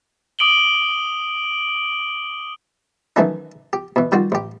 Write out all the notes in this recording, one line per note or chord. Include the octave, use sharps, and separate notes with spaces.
D6 D#6 D7 F#7 G7
D#3 E3 F#3 A3 C#4 D#4
G4
B2 E3
D#3 G3 F4 F#4
A1 G4